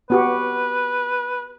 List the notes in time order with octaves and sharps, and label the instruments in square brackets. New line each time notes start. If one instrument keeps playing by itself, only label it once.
[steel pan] B3 F#4 G4 [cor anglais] B4